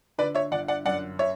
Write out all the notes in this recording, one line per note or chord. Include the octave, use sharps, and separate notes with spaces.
D3 B4 D5
C#5 E5
G1 D5 F#5
D5 F#5
F#2 D5 F#5
C#5 E5